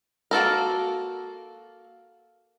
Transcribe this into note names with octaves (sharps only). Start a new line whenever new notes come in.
A#3 F#4 A4 A#4